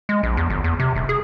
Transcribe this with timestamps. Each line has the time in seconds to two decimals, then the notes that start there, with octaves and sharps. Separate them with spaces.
0.09 G#3
0.23 A#1
0.37 E2
0.50 G1
0.64 E2
0.79 C3
0.96 D#1
1.09 G#4